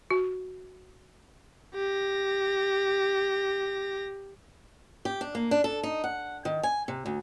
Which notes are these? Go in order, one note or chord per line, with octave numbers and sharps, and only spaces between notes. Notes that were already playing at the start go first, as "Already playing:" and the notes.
F#4
G4 A#6
G4
D4
A#3
D4
A4
D#4
F#5
D#3
G#5
C3
D2